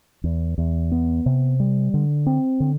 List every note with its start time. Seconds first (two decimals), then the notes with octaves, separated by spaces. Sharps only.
0.24 E2
0.58 E2
0.92 B3
1.26 C3
1.60 G3
1.94 D3
2.26 C4
2.60 D3